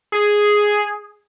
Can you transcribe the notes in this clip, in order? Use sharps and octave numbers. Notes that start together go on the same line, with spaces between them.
G#4